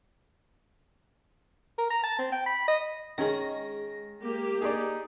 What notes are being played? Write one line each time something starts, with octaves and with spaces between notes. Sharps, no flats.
A#4
A#5
A5
C4
G5
B5
D#5
D#3 G#3 C#4 A#6
A#3 G4
D#4 G#4 D5